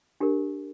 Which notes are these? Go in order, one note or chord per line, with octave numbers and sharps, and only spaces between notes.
D4 G4 A#4